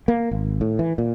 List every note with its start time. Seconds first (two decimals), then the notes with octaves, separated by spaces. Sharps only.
0.08 A#3
0.31 G#1
0.61 A2
0.79 E3
0.98 A#2